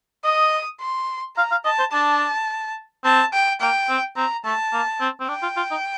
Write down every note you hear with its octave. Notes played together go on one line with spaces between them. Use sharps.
D#5 D#6
C6
F5 A#5
F5
D#5 A5
C5
D4 A5
C4 A5
G5
A#3 G5
C4
C4 A#5
A3 A5
A#3
C4
C4
D4 G5
F4
F4
D#4